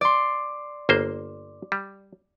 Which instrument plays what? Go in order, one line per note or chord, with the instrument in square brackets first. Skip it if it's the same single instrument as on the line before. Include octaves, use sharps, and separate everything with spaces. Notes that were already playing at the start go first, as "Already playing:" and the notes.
[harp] D5 C6
[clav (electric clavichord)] G1 A#3 C5
G3